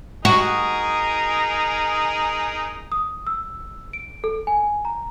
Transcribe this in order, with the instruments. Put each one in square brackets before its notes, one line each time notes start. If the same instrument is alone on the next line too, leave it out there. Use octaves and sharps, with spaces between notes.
[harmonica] D#4 G#4 A#4 [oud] F#4
[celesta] D#6
E6
D7
A4
G#5
A#5